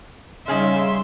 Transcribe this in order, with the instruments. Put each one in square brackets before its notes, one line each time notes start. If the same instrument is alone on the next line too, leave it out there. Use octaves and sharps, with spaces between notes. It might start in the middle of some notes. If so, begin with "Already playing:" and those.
[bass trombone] C#3 [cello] G3 E5 [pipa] D#4 G#4 F5 [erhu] C6